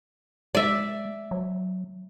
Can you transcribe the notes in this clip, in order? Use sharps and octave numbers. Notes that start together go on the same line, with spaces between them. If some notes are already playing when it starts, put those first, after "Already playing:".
G#3 D5 E5
F#3